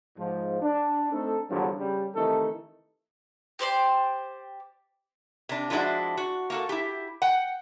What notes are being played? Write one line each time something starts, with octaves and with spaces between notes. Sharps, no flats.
G#2 F3
D4
A3 C4 D4 D#4 A4
E2 G2 D3 F3 F#3
C#3 G3
C3 D#3 E3 A3 D#4 A4
G4 C5 D5 C6
C3 D4
F3 F#3 G#3 D4 E4 F#4
F#4
A#3 F#4 A4
E4 G4
F#5 G5